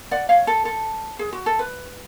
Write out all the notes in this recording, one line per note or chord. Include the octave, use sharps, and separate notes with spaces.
D5 F#5
C#5 F5
A4
A4
G#4
F#4
A4
B4